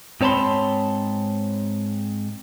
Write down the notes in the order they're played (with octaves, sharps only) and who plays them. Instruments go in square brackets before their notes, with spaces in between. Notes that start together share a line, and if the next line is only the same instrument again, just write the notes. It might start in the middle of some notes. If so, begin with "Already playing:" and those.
[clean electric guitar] G#2 C4 C#5 A5 B5 C6